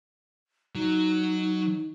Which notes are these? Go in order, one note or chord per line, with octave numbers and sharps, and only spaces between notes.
F#3 D#4